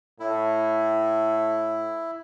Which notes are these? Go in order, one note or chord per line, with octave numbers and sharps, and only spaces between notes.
A2 E4